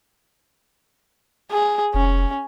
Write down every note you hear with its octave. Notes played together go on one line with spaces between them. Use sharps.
G#4
F1 C#4